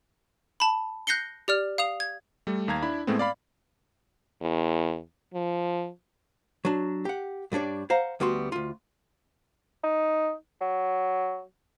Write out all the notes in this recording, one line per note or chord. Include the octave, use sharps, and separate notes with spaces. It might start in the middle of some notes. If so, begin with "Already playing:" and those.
A5 B5
F#6 G6 A#6 C7 C#7 G7
G4 D5 F6
F5 D#6 F7
G#6
G3 A3
D#2 F5 A#5 G#6
D4 E4 B5
A2 G#3 A3 B3 C4
D5 F5 B5
E2
F3
F#3 D4
G4 F#5
G2 G3 D4 C#5 D5
C5 F5 F#5 A#5
D2 G3 B3 F#4 C6
D2 F4
D#4
F#3